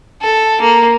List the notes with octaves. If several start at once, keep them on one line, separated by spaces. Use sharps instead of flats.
A4
A#3